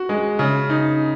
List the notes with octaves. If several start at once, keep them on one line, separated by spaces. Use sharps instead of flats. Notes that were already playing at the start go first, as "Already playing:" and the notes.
Already playing: F#4
G#3
C#3
D#4